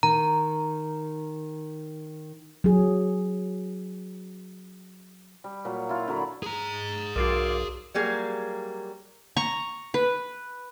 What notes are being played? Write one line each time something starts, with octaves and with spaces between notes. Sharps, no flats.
D#3 A#5
F#3 G#4
G3
A#2 F#3
E4 F4
D3 F#3 A#5 B5
G#4 A#5
B1 F4 F#4 A#4 D5
F#3 G3 A#3 G#4
A#5 C#6
B4